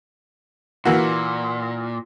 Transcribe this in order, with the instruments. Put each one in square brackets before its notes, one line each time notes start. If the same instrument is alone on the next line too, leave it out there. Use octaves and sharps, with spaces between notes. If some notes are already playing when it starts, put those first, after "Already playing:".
[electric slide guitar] A#2 [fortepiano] E3 A#3 F#4